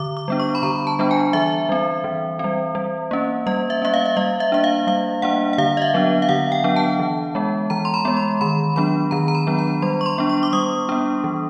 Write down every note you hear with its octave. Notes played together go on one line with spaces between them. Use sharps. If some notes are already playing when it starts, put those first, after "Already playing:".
Already playing: D3 D6
D6
G3 B3 D4
C#6
B5
D3 A#5
A5
G3 B3 D4
G#5
E3 E5
G3 C4
E3
G3 C4
G3
A#3 C#4
G3 D#5
E5
A#3 C#4 E5
F5
E5
G3 D#5
E5
A#3 D4 E5
F5
G3 F5
A#3 D4 F#5
F#5
D3 F5
D#5
E5
F#3 B3 D4
F5
D3 F#5
G5
F#3 B3 D4
A5
E3
G#3 B3
E3 A#5
C6
B5
G#3 B3
C6
D#3 B5
F#3 B3 D4 B5
D#3 A#5
A#5
B5
F#3 B3 D4
A#5
G3 C6
C#6
C6
B3 D4
C#6
D6
G3 D#6
B3 D4
E3